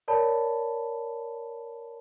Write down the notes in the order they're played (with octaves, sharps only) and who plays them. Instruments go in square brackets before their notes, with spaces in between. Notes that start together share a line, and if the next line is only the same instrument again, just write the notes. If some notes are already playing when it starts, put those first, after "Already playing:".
[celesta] A#4 C#5 D5 A5 B5